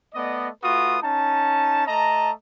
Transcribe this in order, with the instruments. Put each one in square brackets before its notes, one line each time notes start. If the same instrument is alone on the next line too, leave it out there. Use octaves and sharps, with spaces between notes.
[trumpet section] A3 B3 D5 D#5
A3 F4 F#4 B4 D#6
C#4 D#4 A5
A3 D#5 A5 A#5